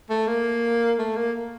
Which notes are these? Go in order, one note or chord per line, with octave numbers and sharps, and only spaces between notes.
A3
A#3
A3
A#3